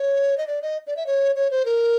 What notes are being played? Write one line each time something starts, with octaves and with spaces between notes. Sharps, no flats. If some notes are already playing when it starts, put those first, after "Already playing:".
Already playing: C#5
D#5
D5
D#5
D5
E5
C#5
C#5
C5
A#4